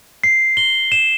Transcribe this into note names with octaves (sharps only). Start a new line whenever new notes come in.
C7
G7
E7